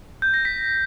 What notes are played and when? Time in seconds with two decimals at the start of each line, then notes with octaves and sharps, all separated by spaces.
0.22 G6
0.34 A#6
0.45 B6